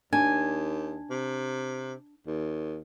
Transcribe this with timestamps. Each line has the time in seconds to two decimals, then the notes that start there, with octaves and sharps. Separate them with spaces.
0.13 D#2 D4 G#5
1.10 C3
2.27 D#2